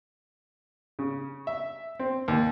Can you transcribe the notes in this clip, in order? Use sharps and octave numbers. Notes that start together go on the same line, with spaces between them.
C#3
E5
C4
D#2